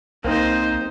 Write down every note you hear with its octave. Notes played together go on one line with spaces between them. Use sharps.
C2 A#3 C4 D#4 C5